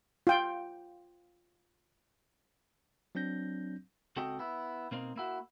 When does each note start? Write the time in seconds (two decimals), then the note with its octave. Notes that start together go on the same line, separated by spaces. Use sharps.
0.27 F4 G5
3.15 F#3 C4 D4 G6 A#6
4.16 C#2 C4 F#4 A4 D#5 G5
4.39 B3 E4
4.91 B2 A#3 C4 D#4
5.16 A#3 E4 F#4